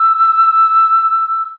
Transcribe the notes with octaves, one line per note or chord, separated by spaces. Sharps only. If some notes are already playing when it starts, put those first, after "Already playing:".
Already playing: E6